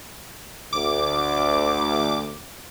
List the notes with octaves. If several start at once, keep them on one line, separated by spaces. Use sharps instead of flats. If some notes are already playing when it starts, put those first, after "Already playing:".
D2 D6